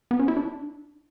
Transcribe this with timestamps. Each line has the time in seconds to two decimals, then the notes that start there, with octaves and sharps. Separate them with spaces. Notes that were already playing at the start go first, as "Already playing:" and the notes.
0.11 B3
0.19 C#4
0.28 E4
0.37 D4